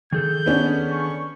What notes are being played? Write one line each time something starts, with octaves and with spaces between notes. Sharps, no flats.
D#3 G#4 A4 G6
B3 C#4 D4
C#6